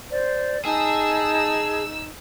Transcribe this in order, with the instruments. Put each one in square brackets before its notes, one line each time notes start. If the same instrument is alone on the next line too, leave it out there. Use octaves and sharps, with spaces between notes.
[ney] C5 [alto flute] D5
[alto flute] D#4 [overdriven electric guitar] G#4 [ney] A5 [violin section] E6